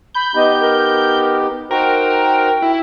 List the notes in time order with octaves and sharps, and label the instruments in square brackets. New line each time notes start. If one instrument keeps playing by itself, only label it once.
[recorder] B5 [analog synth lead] G6
[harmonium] B3 D#4 G4 [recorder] D#5
[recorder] A#4
[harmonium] D#4 F#4 C5 [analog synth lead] A#4 [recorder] G5
[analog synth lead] E4